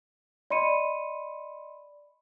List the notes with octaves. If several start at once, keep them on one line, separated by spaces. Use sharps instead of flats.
D5 D#5 B5 C6 C#7 D#7